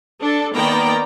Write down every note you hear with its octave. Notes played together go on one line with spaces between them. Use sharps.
D4 A4
D#3 A#3 B3 D5 G5 A#5